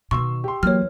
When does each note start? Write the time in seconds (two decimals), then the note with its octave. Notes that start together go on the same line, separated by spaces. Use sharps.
0.11 B2 D#3 C6 C#6 E6
0.44 G4 C6
0.63 E3 F#3 A#3 C#5 F6